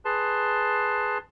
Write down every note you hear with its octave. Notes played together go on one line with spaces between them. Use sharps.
G#4 B4 A5 C6